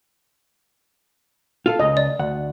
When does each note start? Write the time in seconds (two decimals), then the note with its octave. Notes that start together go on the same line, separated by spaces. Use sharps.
1.66 F4 A4 F5
1.79 C#2 D#5
1.97 D5
2.19 D2 F#5